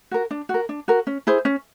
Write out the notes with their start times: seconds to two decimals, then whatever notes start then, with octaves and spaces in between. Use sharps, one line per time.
0.11 F#4 A#4
0.31 D4
0.49 F#4
0.54 A#4
0.69 D4
0.88 F#4 A#4
1.07 C#4
1.27 E4 G#4 C5
1.45 C#4